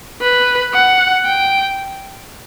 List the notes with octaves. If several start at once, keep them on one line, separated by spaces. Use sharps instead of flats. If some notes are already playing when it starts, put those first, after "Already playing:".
B4
F#5
G5